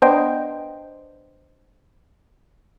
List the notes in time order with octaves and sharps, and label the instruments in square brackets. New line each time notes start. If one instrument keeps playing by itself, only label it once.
[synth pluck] B3 D4 C5 D#5 G5